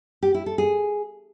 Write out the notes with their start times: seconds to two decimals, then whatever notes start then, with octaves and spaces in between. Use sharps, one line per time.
0.23 G4
0.34 E4
0.46 A4
0.58 G#4